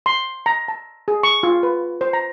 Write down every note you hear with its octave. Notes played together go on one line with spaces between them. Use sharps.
C6
A#5
A5
G#4
C#6
F4
B4
C5
A#5